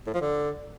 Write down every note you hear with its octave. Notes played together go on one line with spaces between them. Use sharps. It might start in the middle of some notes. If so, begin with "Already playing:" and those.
A2
F3
D3